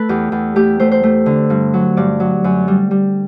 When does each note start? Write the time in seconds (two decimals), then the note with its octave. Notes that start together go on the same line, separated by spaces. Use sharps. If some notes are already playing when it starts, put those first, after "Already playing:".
Already playing: A3 A4 B4
0.09 E2 G4
0.32 E2
0.56 A3 G4
0.80 A3 C5
0.91 C5
1.03 A3
1.26 D3
1.50 G2
1.73 F#3
1.97 G2 D5
2.20 F#3
2.44 F#2
2.68 G3
2.91 G3